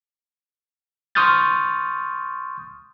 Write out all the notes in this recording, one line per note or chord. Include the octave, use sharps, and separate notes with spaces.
C6 C#6 D#6 F6 G6 A6